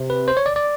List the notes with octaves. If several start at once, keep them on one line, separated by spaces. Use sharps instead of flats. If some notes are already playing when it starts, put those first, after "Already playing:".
Already playing: C3
B4
C5
C#5
D5
D5